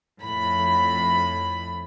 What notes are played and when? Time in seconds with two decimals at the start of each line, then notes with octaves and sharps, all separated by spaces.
0.22 F2 A2 B5